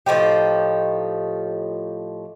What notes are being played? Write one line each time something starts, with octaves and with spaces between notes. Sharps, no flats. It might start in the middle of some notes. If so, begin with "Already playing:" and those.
A2 F3 D#4 G4